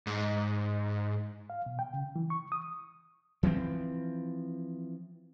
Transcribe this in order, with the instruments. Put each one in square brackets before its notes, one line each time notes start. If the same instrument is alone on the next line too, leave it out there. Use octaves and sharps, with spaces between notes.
[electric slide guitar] G#2
[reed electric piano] F5
B2
G5
C#3
E3
C#6
D#6
[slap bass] E3 F3 A#3 C4